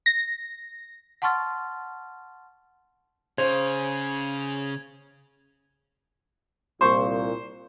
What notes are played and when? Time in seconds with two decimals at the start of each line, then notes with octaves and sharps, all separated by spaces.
0.06 A#6
1.22 F#5 A5 C6 C#6 F6 A6
3.38 C#3 C5 G#6 F7
6.81 C2 A#2 C5 C#6